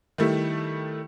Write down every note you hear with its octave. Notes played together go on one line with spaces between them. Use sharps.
D#3 G3 A3 E4